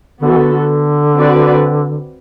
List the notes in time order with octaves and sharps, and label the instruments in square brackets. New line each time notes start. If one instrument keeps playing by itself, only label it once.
[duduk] D3 [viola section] B3 F#4 A4
[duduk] E3
D3
[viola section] C4 F#4 B4 D5